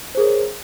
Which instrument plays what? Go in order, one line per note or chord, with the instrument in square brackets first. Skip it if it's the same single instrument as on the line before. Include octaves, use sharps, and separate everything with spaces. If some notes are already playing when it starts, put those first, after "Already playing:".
[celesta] C5
G#4
A#4
C#5